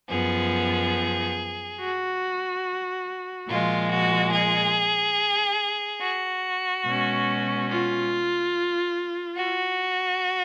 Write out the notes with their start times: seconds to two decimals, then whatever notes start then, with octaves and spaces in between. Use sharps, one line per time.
0.11 F#2 F3 B3 G#4
1.79 F#4
3.48 A#2 F3 G#3 F4
3.90 F#4
4.33 G#4
6.01 F#4
6.86 B2 G#3 C#4
7.70 F4
9.37 F#4